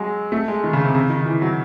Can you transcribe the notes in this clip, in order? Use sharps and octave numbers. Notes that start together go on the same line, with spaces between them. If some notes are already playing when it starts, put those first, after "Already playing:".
Already playing: F#3 G#3
A3
G#3
D#3
C#3
C3
C#3
D#3
E3
F#3